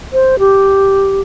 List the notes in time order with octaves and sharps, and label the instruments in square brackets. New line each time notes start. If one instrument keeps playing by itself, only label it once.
[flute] C5
G4